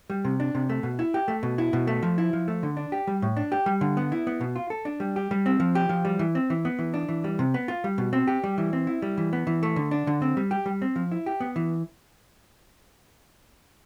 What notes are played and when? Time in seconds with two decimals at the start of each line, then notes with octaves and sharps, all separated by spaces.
0.10 G3
0.25 C3
0.40 D4
0.55 C3
0.70 A3
0.83 B2
0.99 E4
1.14 G4
1.28 A3
1.43 B2
1.58 E4
1.73 B2
1.87 A3
2.03 F3
2.18 E4
2.33 F3
2.48 A3
2.63 D3
2.77 D4
2.92 G4
3.07 G3
3.22 A2
3.37 D4
3.52 G4
3.66 G3
3.81 D3
3.97 B3
4.12 E4
4.27 B3
4.41 B2
4.56 F4
4.70 A4
4.85 D4
5.00 G3
5.16 G4
5.31 G3
5.46 C4
5.60 F3
5.75 G4
5.89 F3
6.05 G3
6.19 E3
6.35 C4
6.50 E3
6.65 B3
6.79 E3
6.94 D4
7.09 E3
7.24 G3
7.39 C3
7.54 B3
7.68 F4
7.84 G3
7.98 B2
8.13 C4
8.27 G4
8.44 G3
8.58 E3
8.73 C4
8.87 E4
9.02 G3
9.18 E3
9.33 B3
9.47 E3
9.63 A3
9.76 D3
9.91 D4
10.07 D3
10.22 C4
10.37 G3
10.51 G4
10.66 G3
10.82 C4
10.96 F3
11.12 E4
11.26 G4
11.40 B3
11.56 E3